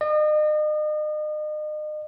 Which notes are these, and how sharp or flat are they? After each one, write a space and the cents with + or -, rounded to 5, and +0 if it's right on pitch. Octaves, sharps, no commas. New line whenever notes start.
D#5 -40